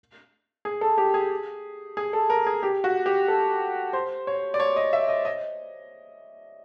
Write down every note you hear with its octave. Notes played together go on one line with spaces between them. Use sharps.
G#4
A4
G4
G#4
G#4
A4
A#4
G#4
G4
F#4
G4
A4
C5
C#5
D5
C#5
D#5
E5
D#5
D#5